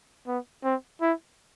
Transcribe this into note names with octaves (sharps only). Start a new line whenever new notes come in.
B3
C4
E4